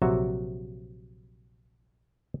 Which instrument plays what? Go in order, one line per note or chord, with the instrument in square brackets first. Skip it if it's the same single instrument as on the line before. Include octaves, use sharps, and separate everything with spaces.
[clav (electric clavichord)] A#1 C3 F#3 F#4 E5 A#5